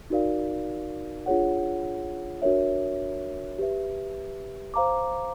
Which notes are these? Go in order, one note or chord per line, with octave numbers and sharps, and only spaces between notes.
D#4 F#4 A#4 D5 F5
D4 F4 G#4 C#5 F#5
D4 F#4 A#4 C#5 E5
G4 B4 E5
C5 F5 A#5 D6